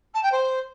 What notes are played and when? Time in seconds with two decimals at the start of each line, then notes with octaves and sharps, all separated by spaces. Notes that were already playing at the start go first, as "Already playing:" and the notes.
0.14 A5
0.23 G5
0.32 C5